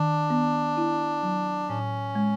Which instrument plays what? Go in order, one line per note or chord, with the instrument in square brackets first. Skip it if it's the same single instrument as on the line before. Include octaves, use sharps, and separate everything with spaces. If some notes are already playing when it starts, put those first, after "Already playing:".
Already playing: [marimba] D#3 [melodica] D4
[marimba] B3
E4
F#3
[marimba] A2 [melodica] C#4
[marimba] G#3